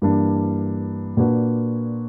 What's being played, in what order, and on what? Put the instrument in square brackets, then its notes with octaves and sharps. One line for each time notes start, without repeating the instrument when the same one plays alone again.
[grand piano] G2 E3 A#3 D4
A#2 A#3 D4 F#4 B4